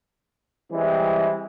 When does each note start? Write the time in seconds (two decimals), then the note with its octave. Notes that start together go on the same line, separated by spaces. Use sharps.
0.71 E3 G3 G#3 C4 E4